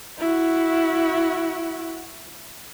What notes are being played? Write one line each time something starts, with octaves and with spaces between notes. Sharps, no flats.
E4 F#4